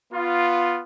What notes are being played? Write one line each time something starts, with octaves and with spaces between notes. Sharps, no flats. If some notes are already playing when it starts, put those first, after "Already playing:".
B3 F4